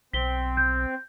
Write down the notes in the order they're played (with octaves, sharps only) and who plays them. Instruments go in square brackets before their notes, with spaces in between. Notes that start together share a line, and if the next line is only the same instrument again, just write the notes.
[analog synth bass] B1 [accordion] C4 [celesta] B6 G7
[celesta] G6